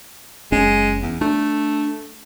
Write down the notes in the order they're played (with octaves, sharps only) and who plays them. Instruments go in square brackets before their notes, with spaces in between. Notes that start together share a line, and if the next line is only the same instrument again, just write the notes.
[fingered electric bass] F#1 C#4 [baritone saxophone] G#3
[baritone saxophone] E2
[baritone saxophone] A3 [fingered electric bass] D4